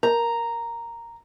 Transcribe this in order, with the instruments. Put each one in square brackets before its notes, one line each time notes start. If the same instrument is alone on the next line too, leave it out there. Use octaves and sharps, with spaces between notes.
[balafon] A#4 [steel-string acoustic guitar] A#5